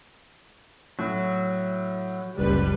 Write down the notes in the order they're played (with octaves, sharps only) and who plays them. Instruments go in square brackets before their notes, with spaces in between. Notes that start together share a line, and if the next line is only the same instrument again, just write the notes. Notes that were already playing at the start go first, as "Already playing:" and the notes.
[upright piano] A2 [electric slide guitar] F#3
[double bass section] F#1 C#2 [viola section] G3 B4